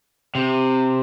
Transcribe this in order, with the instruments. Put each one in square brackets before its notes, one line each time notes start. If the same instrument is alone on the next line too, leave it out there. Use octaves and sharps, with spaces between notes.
[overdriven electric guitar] C3